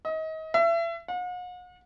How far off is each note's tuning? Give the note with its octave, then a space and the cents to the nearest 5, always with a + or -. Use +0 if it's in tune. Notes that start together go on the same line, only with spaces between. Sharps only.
D#5 +30
E5 +30
F#5 -45